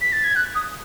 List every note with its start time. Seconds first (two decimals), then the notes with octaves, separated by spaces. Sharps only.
0.01 B6
0.13 A6
0.24 G#6
0.36 F#6
0.55 D#6